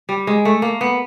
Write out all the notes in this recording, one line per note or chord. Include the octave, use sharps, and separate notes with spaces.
G3
G#3
A3
A#3
B3